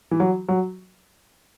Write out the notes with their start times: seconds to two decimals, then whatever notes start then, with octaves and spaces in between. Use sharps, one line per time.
0.11 E3
0.20 F#3
0.48 F#3